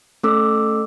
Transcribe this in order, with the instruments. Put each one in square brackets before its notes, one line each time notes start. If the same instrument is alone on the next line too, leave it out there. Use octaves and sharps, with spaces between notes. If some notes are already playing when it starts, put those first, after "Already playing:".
[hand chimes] A3 C#4 A4 D6 E6